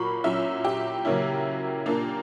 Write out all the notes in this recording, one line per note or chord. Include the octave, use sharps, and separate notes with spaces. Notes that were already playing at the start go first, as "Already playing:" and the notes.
Already playing: A#2 F#3 A#3 B5 C#6
A#2 F#3 C#4 E4 E5
G4
C#3 F#3 A#3 C#4 E4
A#2 A#3 D4